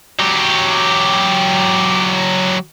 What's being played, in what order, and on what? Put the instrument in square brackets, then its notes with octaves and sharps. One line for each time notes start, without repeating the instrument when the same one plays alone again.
[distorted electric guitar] F#3 G4